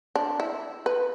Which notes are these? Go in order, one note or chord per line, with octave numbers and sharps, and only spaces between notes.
D4
E4
B4